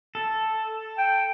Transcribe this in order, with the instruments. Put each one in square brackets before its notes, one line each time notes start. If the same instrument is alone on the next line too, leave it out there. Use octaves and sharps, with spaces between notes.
[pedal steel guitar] A4
[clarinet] G5